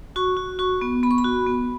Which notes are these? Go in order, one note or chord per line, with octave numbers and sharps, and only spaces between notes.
F#4 C#6
F#4
F#4 C#6
B3
B3 B5
C#6
B5
F#4
B3